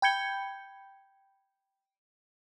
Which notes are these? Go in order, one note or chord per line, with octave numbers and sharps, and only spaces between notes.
G5 B5 G6 G#6 C#7 G7